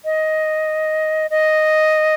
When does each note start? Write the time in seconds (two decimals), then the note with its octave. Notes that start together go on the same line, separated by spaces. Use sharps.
0.05 D#5
1.31 D#5